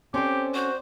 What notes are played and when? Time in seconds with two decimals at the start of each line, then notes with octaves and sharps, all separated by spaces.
0.14 C4 C#4 G4 A4 D5 C6
0.54 F#4 C5